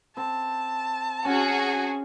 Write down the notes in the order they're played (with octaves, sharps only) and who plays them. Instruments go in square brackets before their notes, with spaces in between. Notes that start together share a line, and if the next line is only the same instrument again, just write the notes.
[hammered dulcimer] C4 [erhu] A5
[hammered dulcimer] C#4 [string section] F#4 G#4 [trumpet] G#5